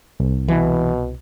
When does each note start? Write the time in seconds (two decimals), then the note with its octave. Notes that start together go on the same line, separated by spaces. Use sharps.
0.20 C2
0.48 B2 E3